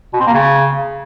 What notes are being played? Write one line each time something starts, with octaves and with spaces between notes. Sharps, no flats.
B2
C4
A#3
C#3